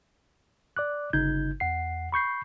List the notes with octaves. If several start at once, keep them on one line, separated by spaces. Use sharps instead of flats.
D5 D6 F#6
G1 C#3 D#4 G6 G#6
E2 F#5 C7
B5 C#6 G6 C7